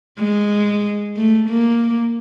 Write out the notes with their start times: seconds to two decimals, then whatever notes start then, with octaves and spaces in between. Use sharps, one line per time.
0.19 G#3
1.17 A3
1.50 A#3